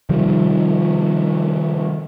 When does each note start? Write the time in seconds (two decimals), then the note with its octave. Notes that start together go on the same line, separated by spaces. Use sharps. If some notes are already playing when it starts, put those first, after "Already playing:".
0.09 C3 D#3 F3 G3